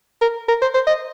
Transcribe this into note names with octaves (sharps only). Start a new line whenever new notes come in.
A#4
A#4
C5
C5
D#5